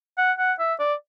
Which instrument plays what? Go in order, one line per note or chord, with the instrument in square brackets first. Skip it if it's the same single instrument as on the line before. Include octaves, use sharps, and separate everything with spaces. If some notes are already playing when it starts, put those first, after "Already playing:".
[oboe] F#5
F#5
E5
D5